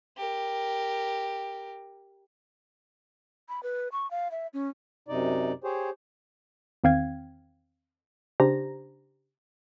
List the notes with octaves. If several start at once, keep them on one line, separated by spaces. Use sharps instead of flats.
G4 A#4
B5
B4
C#6
F5
E5
C#4
F#2 C3 D#4 D5
G4 G#4 C5 C#5
E2 D#3 C4 F5 G5 G#6
C#3 D4 G4 C5 A#5 A#6